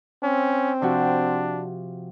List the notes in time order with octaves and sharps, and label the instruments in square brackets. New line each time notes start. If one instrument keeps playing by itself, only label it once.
[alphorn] C4 [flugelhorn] C#4
[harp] C3 F3 F#4 [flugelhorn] D4